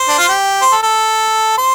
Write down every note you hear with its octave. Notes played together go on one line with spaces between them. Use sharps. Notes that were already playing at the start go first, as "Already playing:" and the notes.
Already playing: C5
D4
F4
G4
C5
A4
A4
C5